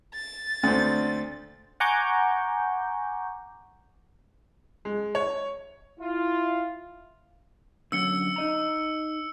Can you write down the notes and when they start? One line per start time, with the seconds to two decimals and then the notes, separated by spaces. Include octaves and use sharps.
0.15 A6
0.63 D2 D3 C4
1.80 F#5 G#5 A#5 C#6 D6 G6
4.85 G#3
5.15 C#5
6.00 E4 F4
7.92 D3 F#3 C#4 E6 C#7 G7
8.36 D#4 D#5 A#5